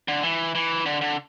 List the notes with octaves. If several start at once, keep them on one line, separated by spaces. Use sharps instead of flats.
D3
E3
E3
D3
D3